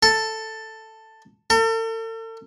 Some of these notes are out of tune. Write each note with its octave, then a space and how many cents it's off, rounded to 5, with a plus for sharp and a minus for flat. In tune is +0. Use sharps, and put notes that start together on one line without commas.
A4 +10
A4 +45